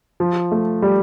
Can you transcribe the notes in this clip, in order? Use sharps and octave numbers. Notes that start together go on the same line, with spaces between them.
F3
A3
G3